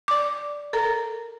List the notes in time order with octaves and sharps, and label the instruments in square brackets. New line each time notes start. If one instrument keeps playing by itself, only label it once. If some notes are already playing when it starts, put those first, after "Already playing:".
[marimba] D5 D6
A4 A#4 A#5